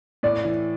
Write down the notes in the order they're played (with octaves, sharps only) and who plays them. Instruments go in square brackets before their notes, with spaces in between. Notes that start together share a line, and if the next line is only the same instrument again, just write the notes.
[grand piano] A2 [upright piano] D5
[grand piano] E3